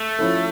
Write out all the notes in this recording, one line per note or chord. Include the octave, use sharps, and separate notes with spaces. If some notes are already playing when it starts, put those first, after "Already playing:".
Already playing: A3
F3 C#4 E4 A4